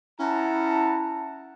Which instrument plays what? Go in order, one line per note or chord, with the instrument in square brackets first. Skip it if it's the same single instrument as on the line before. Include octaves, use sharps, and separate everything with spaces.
[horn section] C#4 E4 F#5 A5 A#5